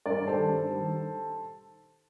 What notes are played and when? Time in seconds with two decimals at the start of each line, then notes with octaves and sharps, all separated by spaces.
0.06 G2 A#4 D5
0.27 D#3 G3 A4 C5
0.49 G2
0.70 D#3 G3